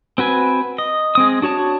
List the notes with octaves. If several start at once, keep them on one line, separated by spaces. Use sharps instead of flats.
C4 F#4 B4 G#5
D#5
G#3 C4 D#6
D4 F#4 C#5 A5